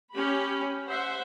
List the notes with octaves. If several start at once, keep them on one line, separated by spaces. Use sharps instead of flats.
C#4 G4 B5
C5 E5 F#5